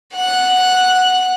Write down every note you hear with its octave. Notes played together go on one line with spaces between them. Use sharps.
F#5 F#6